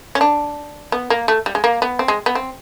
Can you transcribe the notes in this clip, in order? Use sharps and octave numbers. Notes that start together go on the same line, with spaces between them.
C#4
D4
B3
A#3
A3
G3
G#3
A#3
B3
C4
G#3
B3
C4